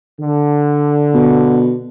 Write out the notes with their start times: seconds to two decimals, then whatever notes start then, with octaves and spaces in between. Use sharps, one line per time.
0.21 D3
1.14 B2